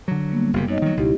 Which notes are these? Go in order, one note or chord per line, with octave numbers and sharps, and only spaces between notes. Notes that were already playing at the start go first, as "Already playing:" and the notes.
D3 F#3
G3 A#3 B3
F#1 C3
F#2 D#4 C#5 D#5
D#3 F#3
C#2 B2 D#4 E4 G4